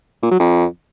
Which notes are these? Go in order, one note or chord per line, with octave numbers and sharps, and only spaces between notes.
A#2
F#3
F2